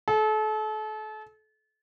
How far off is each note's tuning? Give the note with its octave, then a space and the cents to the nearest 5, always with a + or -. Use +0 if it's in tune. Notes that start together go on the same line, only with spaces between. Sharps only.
A4 -35